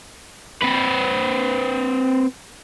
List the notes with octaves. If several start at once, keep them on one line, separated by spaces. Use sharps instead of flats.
C4 B4